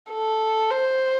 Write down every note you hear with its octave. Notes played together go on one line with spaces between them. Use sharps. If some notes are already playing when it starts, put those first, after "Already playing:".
A4
C5